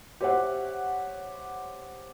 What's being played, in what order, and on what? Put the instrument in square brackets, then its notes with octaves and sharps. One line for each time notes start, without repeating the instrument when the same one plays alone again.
[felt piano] G4 C5 C#5 E5 F#5